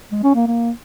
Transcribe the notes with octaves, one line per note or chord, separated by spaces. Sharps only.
G#3
C#4
A#3
A#3